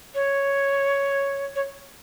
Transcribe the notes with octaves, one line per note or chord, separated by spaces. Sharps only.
C#5
C#5